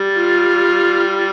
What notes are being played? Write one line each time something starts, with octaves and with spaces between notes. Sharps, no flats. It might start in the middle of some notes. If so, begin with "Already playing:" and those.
Already playing: G3
F4